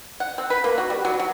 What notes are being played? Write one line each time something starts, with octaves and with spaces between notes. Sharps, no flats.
F#5
C4
B4
A#3
F#4
G3
F#3
F#3